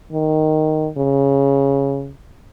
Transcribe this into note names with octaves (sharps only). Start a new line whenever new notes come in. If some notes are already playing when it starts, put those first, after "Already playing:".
D#3
C#3